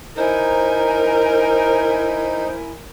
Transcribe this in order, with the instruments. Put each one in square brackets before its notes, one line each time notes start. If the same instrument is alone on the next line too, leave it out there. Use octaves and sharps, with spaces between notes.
[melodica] D#4 [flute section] E4 G#5 [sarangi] A#4 [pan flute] C5